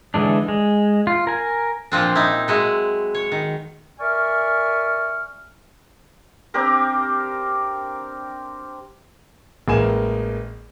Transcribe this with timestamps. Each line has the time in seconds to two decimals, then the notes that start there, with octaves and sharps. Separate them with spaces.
0.14 D3 E3 G#3 D4
0.48 G#3
1.07 F4
1.27 A#4 G#5
1.92 A#2 F3 C4 D4
2.15 D#4 E4
2.48 F#3 G#3 E4
3.15 C#5
3.32 D#3
4.00 A#4 D5 E5 G#5 C#6 F6
6.54 C4 D4 G4 A#4
9.68 A1 G#3 A#3 G#5 E7